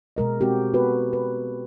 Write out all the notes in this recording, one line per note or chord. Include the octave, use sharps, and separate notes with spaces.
B2 G#3 A#4 D#5
G#3 C4 F#4 G4
B3 F#4 A4 B4
B4